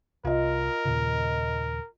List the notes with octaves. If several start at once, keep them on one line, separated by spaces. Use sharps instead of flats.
C2 F4 A#4 D#5
D#2 A#2 C#3